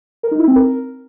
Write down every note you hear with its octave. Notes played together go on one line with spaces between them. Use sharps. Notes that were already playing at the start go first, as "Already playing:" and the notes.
A#4
D#4
E4
C4
A#4